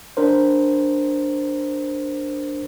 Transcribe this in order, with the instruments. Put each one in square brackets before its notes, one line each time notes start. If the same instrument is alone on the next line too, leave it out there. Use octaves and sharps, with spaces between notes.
[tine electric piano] D4 A#4 C5